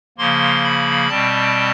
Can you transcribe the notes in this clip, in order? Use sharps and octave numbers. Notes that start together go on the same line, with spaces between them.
C#3 F3 A#3 C6
B5
B2 G3 C4 A5